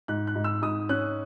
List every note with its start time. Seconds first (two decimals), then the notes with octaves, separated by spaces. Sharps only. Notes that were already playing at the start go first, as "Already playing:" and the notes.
0.08 G#2 F#6
0.27 F#6
0.35 G#2
0.44 E6
0.62 G#2 D#6
0.89 C#4 F#6